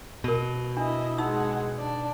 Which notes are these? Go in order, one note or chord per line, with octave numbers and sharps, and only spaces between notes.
B2 A#4 E6
D4 E4 D#5
G#3 D#4 F#5 E6
D4 D5